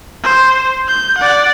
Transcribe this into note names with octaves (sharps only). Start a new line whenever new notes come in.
C5
G6
D5 F#5